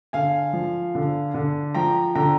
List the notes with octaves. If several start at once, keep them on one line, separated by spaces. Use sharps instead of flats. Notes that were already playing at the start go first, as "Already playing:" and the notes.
D3 F5 G#5
F3
D3
D3
F3 G5 A#5
D3 G5 A#5